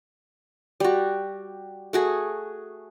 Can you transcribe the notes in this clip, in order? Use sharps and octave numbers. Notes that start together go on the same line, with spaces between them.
G3 F#4
A3 F#4 G#4